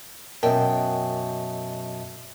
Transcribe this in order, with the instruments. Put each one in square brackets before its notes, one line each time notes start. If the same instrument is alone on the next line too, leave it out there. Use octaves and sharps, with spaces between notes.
[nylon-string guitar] F#2 B2 [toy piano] A#4 [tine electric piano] D#5 E5 A5 [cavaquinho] G5